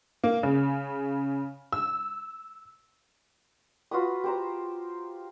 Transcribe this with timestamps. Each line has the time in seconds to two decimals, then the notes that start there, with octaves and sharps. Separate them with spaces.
0.24 A#3
0.43 C#3
1.72 E6
3.91 F4 F#4 B4 D#6
4.24 G4 C5 A#5